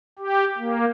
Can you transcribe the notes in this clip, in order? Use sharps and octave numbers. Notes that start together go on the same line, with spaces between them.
G4
A#3